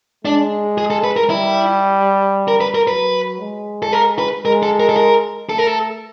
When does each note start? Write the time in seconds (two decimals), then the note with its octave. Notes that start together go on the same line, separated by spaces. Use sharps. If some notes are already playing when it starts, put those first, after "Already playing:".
0.25 G#3 D4
0.78 G#4
0.90 A4
1.04 B4
1.17 A#4
1.30 G3 E4
2.48 A#4
2.61 B4
2.75 A#4
2.88 F#3 B4
3.40 G#3
3.83 A4
3.92 A#4
4.19 B4
4.45 G#3 A#4
4.63 A4
4.80 A#4
4.89 A4
4.97 A#4
5.50 A3 A4
5.58 A#4
5.67 A4